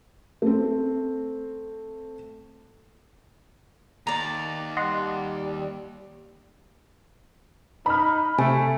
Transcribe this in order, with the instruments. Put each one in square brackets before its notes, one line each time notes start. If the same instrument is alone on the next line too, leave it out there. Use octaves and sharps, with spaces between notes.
[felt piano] A3 C4
[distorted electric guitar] D#2 [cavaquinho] D5 A#5
[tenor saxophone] G3 [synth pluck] D#5 F#5 C6
[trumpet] D#4 [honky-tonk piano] B5 F6
[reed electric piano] C3 [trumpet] A3 [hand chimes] G#5